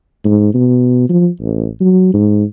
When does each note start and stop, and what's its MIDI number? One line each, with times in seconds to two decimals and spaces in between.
0.25 0.50 44
0.54 1.08 47
1.09 1.28 53
1.40 1.68 33
1.81 2.11 54
2.14 2.44 44